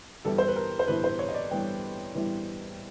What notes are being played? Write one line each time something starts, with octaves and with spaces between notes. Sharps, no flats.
G2 E3 G3 B3 E4 A4
C5
B4
A#4
C5
G2 E3 G3 B3 E4 B4
C5
C#5
D#5
D5
G2 E3 G3 B3 E4 G5
G2 E3 G3 B3 E4